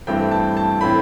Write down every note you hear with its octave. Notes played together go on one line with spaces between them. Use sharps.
G2 E3 A3 C4 G5
A5
A5
A2 E3 A3 C4 B5